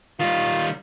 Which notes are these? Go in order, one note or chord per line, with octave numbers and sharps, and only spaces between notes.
D#3 G3 F4